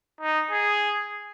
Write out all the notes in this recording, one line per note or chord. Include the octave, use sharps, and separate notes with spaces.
D#4
G#4